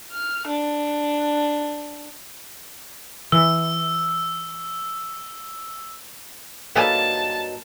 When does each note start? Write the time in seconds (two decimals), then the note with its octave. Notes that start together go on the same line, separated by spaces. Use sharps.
0.12 F6
0.48 D4
3.32 E3 E6
6.76 G2 F#3 A#3 D#4 A4 B4 A5